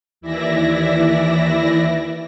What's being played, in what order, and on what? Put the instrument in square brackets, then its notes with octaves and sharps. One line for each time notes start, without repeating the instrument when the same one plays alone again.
[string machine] D#2 E3 E4 D5 E5 A#6